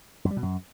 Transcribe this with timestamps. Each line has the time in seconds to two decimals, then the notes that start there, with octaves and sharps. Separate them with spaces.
0.25 F#2
0.31 G3
0.37 B2
0.43 F#2